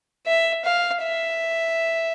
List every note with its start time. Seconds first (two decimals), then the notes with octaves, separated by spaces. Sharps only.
0.26 E5
0.65 F5
1.02 E5